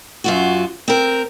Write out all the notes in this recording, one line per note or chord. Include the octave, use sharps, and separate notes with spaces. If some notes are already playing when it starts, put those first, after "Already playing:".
F#2 F4 F#4
C4 A#4